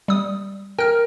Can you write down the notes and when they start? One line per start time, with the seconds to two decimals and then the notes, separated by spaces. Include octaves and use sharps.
0.08 G3 D#6
0.79 A#4 G5 F6